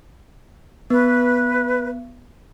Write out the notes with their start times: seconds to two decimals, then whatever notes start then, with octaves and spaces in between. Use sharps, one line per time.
0.90 B3 B4